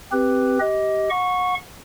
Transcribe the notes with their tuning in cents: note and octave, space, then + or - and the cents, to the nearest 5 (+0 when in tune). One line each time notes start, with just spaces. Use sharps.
C4 +0 G4 +0 B4 +0
G4 -10 D#5 +20
F#5 -30 C#6 +0